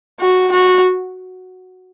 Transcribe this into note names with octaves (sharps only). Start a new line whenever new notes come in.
F#4
F#4